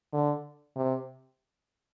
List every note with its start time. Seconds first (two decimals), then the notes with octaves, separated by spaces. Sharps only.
0.13 D3
0.76 C3